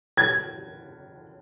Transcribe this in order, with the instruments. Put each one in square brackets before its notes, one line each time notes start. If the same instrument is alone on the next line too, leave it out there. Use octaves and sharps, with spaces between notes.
[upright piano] G#6